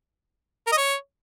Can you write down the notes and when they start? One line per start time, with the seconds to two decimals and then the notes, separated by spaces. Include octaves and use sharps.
0.67 A#4
0.72 D#5
0.77 C#5